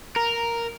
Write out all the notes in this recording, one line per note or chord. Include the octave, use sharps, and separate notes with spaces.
A#4